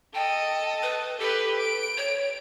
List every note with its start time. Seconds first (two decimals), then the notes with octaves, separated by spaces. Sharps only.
0.14 A4 D#5 G5
0.83 B4
1.20 G4 A4 B4
1.59 D7
1.97 C#5